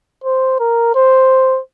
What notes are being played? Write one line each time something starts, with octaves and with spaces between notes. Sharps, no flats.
C5
A#4
C5